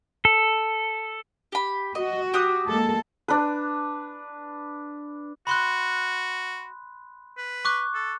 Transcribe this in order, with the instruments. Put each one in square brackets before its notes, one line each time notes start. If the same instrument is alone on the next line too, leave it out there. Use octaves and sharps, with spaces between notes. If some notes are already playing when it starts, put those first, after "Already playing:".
[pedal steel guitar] A4
[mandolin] G4 B5
[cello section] F#4 [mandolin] D#5
[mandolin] G4 D#6 F#6
[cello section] G#3 A#3 A4
[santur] D4 B4
[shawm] F#4 [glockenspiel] B5 C6 F#6
[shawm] B4
[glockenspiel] C#6 D6 F#6
[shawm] A4